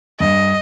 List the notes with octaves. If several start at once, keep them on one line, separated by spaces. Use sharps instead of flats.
G2 D#5